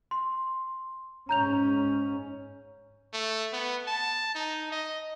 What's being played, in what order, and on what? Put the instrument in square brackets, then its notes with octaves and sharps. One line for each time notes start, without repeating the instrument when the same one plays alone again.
[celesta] C6
[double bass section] G#2 C#4 [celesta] A#5 G6 F7
[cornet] A3
B3
A5
D#4
D#5